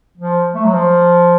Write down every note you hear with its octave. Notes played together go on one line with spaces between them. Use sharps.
F3
A3
F#3
F3